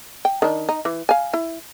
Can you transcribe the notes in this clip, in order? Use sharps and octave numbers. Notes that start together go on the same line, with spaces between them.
G5
D#3 D4
D#4
E3
F5 G#5
E4